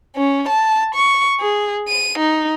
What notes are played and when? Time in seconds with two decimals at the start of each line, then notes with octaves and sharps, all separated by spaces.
0.17 C#4
0.49 A5
0.95 C#6
1.40 G#4
1.88 D#7
2.19 D#4